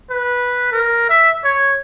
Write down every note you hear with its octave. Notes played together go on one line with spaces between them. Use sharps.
B4
A#4
E5
C#5